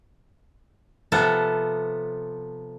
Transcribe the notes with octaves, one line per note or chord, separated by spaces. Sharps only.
C3 F3 B3 A4